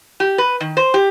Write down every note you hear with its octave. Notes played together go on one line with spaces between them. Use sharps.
G4
B4
D#3
C5
G4